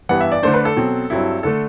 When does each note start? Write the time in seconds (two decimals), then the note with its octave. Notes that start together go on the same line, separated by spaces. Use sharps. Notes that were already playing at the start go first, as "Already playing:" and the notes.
0.09 G2 E3 G3 B3 F#5
0.21 E5
0.32 D5
0.43 D3 A3 D4 C5
0.54 B4
0.65 A4
0.76 B2 F#3 C4
1.10 G2 F#3 C4 E4
1.43 D3 A3 A4